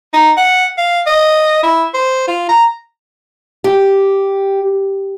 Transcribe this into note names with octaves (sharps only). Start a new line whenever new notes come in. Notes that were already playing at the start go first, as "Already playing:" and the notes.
D#4
F#5
F5
D#5
E4
C5
F4
A#5
G4